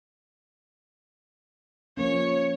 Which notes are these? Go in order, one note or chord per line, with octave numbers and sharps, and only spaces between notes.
F3 A#3 C#4 C#5